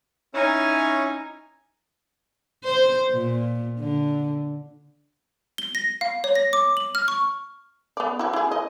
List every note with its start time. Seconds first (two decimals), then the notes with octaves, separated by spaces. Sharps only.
0.34 C#4 D#4 E4 C#5 G#5
2.64 C5
3.11 A#2
3.80 D3
5.58 G7
5.75 A#6
6.01 F5
6.24 C#5
6.35 A#6
6.53 D6
6.77 F#7
6.95 F6
7.08 C#6
7.97 B3 D5
8.19 E4 F#4
8.33 E4 G#4
8.51 D#5